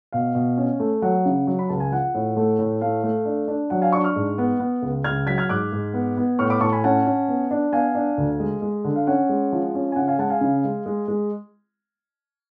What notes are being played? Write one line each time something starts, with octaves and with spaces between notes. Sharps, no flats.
B2 F5
B2
C#4
A3
F#3 F#5
C#3
F#3
B5
C#2 A5
G#5
F3 F#5
A2
A3
A2
A3 F5
A3
D4
D4
F#3 F#5
F5 G#5
D4 A5 C#6
C#6 F6
G#2
B3
B3
C#2
C#2 F6 G#6
F#3 G#6 B6
F6 G#6
G#2 D6 F#6
G#2
B3
B3
A2 C#6 F6
B5 D6
A2 A5 C#6
G#5 B5
C#4 F#5 A5
C#4
B3
D4
B3 F5 G#5
D4
D2
G#3
G#3
D3
F5
C#4 F#5
G#3
F3
C#4
G#5
C#3 F#5
F5 G#5
G#3 F#5 A5
F5 G#5
C#3
G#3
G#3
G#3